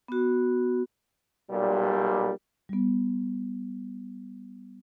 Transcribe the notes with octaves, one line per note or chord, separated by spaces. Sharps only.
B3 F#4
B1 A#2 G3
G3 B3